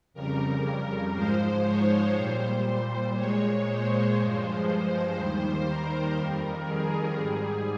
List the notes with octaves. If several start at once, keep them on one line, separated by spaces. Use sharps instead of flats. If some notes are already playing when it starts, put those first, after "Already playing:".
F2 C#3 G3 A#4
G#2 F3 G#3 C5
C#5
A#2 G3 C5
A#2 G#3 C#5
C5
G2 F3 G#3
C5
D#2 D#3 G3
A#4
F2 D#3 G3
G#4
G#2 G3